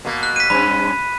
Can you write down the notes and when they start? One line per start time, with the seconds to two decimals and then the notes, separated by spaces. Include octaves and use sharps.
0.05 B2 A#3
0.23 F#6
0.36 B6 D#7
0.50 G2 C#4 B5